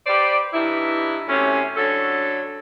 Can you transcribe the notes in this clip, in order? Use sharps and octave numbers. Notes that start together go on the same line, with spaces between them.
G4 B4 C5 D5
G2 E3 D#4 E4
C3 F#3 A3 C#4
D3 F#3 A4